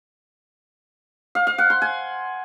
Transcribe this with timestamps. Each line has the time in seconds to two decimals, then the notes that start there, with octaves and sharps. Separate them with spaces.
1.35 F5
1.47 F5
1.58 F#5
1.70 C6
1.82 G#5